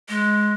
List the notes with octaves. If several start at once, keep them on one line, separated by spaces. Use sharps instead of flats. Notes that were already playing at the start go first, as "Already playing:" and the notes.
G#3